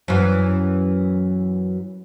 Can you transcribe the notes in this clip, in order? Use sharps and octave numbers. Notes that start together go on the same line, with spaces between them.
F#2 E3